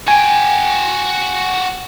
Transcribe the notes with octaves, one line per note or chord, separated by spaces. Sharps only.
F#4 G5 G#5